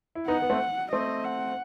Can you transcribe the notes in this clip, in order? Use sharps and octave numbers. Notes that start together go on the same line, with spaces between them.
E4
B3 D#4 F#5
B3
A3 C4
A3 C4 D#5
F#5